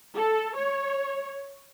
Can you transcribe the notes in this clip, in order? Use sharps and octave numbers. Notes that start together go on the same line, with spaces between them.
A4
C#5